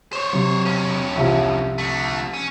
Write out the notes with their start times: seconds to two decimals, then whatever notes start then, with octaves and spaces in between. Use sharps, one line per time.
0.13 C5 C#5
0.33 C3 F#3
0.65 G2 C#4
1.16 C2 F3 E5
1.78 D3 A3
2.33 C#4